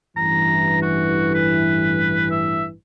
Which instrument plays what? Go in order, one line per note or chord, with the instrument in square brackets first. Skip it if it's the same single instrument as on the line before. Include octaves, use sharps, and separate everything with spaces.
[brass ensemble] A1 G2 E3 [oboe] A#5
[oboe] F#4
B4
E5